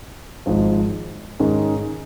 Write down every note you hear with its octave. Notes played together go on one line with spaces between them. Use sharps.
G#1 G#2 F3
G#2 D#3 G#3 C#4 G#4